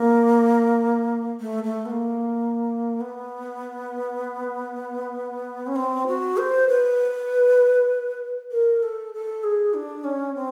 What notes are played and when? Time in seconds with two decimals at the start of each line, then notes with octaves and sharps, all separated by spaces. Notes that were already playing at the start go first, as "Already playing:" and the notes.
Already playing: A#3
1.40 A3
1.63 A3
1.86 B3
1.90 A#3
3.01 B3
5.67 C#4
5.76 C4
6.07 F#4
6.38 C5
6.68 B4
8.52 A#4
8.83 A4
9.13 A4
9.44 G#4
9.74 D4
10.04 C#4
10.35 C4